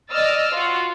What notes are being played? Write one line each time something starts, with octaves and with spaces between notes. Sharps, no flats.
D5 D#5 E6 F6 A6
F4 F#4